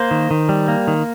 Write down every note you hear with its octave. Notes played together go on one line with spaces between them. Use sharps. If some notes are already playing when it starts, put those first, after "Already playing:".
Already playing: A#3 C5
D#3
D#3
G3
A#3
D#3